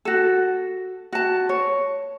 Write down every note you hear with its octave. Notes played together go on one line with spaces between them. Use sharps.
F#4 A4
F#4 A5
C#5